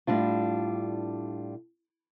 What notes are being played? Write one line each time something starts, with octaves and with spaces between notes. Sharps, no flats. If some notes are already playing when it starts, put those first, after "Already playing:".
A2 G3 D4 F4